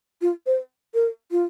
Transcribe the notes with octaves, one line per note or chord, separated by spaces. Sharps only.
F4
C5
A#4
F4